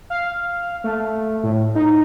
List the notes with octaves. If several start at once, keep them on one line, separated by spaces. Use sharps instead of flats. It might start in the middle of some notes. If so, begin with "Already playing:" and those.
F5
A3
A2
D#4